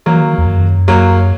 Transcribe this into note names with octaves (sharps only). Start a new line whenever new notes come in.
E3 F#3 A#3
D#3
E2
F#2
F#3 A#3